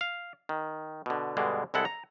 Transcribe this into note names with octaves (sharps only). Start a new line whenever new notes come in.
F5
D#3
B2 D3
G2 B2 D3 G#3
C2 G#3 E4 A4 F#5
A#5